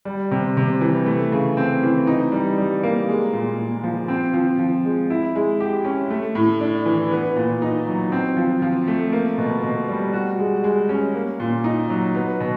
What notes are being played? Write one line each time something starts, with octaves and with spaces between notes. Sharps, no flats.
G3
C3
C3
E3
A3
C#3
C4
E3
D#4
G3
G3
A#3
G#3
A#2
A#2
F3
C4
F3
F3
G#3
E4
G#3
G4
C#4
A3
A2
D4
E3
B3
A#2
D#4
F#3
C4
F3
F3
A3
A#3
B2
B2
G3
F#4
G#3
G#3
C#4
A#3
A#2
D#4
F#3
B3
B2